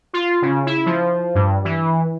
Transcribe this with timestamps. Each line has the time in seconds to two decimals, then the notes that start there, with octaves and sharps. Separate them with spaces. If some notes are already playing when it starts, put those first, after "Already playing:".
0.13 F4
0.42 C#3
0.66 E4
0.86 F3
1.35 G2
1.65 E3